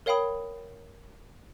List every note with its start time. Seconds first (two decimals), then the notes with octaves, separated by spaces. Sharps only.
0.06 A#4 C#5 F5 G5 B5 D#6